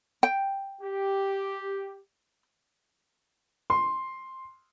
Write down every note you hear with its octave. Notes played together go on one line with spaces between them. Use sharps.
G5
G4
C6